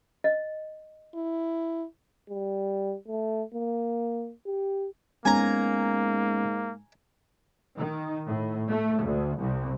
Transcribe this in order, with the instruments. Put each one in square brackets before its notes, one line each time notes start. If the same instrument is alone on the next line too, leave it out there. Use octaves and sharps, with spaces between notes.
[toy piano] D#5
[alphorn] E4
[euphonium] G3
A3
A#3
G4
[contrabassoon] G#2 [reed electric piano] G#3 B3 C#4 [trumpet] A#3 [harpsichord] G#5 A#5
[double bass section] D#3
A2
A3
D2
C2